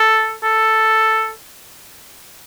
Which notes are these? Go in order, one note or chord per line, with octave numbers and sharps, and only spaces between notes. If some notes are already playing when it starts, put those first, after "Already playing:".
Already playing: A4
A4